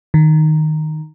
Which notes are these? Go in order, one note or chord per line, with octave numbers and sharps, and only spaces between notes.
D#3